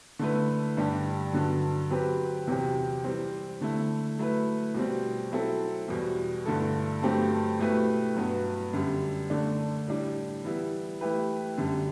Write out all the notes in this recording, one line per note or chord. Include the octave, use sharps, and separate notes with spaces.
D3 A3 E4 B4
G2 D3 G3 D4 G4
G2 D3 F#3
F#3 C4 G4 B4
E2 C3 F#3 C4 G4
E3 G3 C4
D3 A3 E4
F#3 A3 E4 B4
B2 G3 C4
F#3 C4 E4 A4
E2 B2 G3
G2 D3 A3 E4 A4
G2 F#3 A3 C4 G4
B2 A3 E4 G4 B4
G2 F#3 B3
F#2 D3 G3
D3 A3 D4
A2 G3 D4
E3 G3 B3 E4
E3 A3 E4 G4 B4
F#2 D3 G3